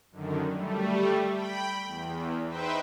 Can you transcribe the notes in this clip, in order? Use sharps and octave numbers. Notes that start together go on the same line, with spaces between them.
F#2 D3 D#3
G3 A3
G5 B5
E2
D#4 B4 C5 E5 G5